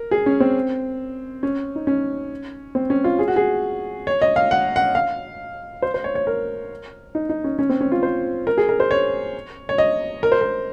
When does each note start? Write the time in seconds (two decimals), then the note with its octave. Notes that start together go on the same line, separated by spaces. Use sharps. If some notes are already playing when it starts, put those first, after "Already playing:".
Already playing: A#4
0.11 G#4
0.26 C#4
0.40 C4
1.43 C#4
1.75 D#4
1.87 C#4
2.75 C4
2.90 C#4
3.04 F4
3.19 G#4
3.28 F#4
3.36 G#4
4.07 C#5
4.22 D#5
4.36 F5
4.51 F#5
4.76 F#5
4.95 F5
5.82 C5
5.94 C5
6.04 C#5
6.15 C#5
6.27 A#4
7.15 D#4
7.29 D#4
7.44 C#4
7.59 C#4
7.69 C4
7.81 C#4
7.92 F4
8.03 C5
8.47 A#4
8.58 G#4
8.69 A#4
8.80 C5
8.91 C#5
9.69 C#5
9.78 D#5
10.23 A#4
10.32 C5
10.41 A#4